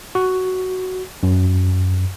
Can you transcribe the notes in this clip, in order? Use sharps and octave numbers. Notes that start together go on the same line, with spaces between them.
F#4
F#2